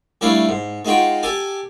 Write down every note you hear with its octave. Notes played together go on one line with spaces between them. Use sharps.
G3 A3 D4 E4 C#5 F5
G#2
G#3 D#4 F4 F#4 G5
G4 A4 G#5